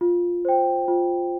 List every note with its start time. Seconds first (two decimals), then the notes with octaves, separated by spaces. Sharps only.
0.01 F4
0.45 C5 G5
0.88 F4